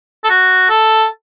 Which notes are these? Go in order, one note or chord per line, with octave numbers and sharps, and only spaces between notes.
A4
F#4
A4